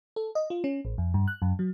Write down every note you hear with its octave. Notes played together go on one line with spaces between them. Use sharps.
A4
D#5
F4
C#4
A1
F2
G2
F#6
F#2
F#3